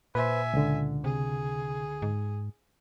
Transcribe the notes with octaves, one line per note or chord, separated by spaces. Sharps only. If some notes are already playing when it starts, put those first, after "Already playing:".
A#2 B4 C5 E5 G#5
C#2 D3
C3 G#4
G#2